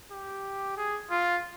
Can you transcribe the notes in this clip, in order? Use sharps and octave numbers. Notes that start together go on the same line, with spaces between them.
G4
G#4
F4